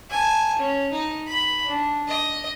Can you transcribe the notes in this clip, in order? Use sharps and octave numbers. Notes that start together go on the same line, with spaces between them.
G#5 A5
C#4
D#4
B5
D4
D#5